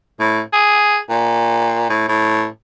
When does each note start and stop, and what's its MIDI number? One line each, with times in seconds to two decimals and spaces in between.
0.20 0.40 45
0.53 0.98 68
1.10 1.89 46
1.89 2.04 45
2.08 2.46 45